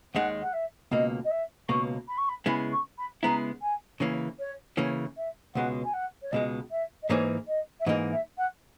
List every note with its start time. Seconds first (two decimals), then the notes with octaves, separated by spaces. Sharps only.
0.15 D#2 D#3 G#3 D#4 F#5
0.42 F#5
0.53 E5
0.91 C#2 B2 A#3 D#5
1.25 D#5
1.31 E5
1.69 C#2 B2 A#3 C#6
2.08 B5
2.18 C#6
2.29 B5
2.46 C#3 G#3 B3 E4 B5
2.72 C#6
2.98 B5
3.23 C#3 G#3 B3 E4 A#5
3.62 G#5
4.00 C#3 E3 A#3 C#5
4.39 C#5
4.77 C#3 E3 A#3 C#5
5.17 E5
5.55 C#2 B2 G#3 F#5
5.84 G#5
5.93 F#5
6.22 C#5
6.32 C#2 B2 G#3 D#5
6.71 E5
7.03 D#5
7.09 G#2 E3 A#3 D#4 G#4 C#5
7.47 D#5
7.80 E5
7.86 G#2 E3 A#3 D#4 G#4 D#5
8.12 E5
8.38 F#5